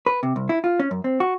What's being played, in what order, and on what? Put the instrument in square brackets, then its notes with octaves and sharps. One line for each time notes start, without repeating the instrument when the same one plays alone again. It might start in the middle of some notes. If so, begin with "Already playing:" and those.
[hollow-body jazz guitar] B4
C3
C2
E4
F4
C#4
F#2
C4
F#4